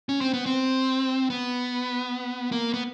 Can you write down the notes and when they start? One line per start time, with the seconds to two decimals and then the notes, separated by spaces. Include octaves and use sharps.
0.09 C#4
0.21 C4
0.33 B3
0.46 C4
1.30 B3
2.52 A#3
2.74 B3